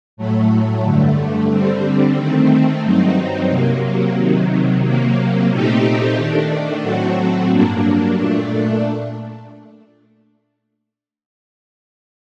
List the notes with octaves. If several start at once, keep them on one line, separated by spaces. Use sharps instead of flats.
A2 F#3 A3
G2 D3 A3
D3 G3 C4
D#3 A3 C4
G2 F#3 C4 D#4
C3 F#3 A#3
C3 D#3 F#3
C3 F#3 A#3
A#2 A3 C4 D#4 G4
D#3 A3 D4
A2 F#3 A3 C4 F#4
G2 F#3 A#3 D4
A#2 A3 D4